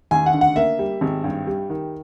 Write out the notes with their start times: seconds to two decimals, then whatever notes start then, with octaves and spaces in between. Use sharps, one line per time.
0.11 D#2 G#5
0.26 F#5
0.34 D3
0.41 F#5
0.56 A#3 E5
0.79 G3
1.01 G#1
1.24 G2
1.47 G3
1.70 D#3